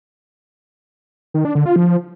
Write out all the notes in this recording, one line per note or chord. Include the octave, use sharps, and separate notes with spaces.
D#3
D4
D3
F4
F3